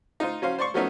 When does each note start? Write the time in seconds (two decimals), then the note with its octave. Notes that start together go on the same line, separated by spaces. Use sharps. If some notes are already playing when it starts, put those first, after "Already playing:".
0.20 D#4 F4 C5
0.42 F#3 C#4 C5 F5
0.59 C5 D5 C6 C#6
0.74 F3 F#3 A3 B3 C#4 D#4